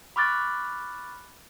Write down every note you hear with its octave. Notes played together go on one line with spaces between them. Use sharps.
B5 C#6 D6 F6 F#6 A6